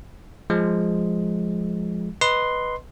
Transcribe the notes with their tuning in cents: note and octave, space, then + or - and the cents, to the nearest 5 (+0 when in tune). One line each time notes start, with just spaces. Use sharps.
F3 +5 G#3 +5
B4 +0 D#5 +0 C6 +0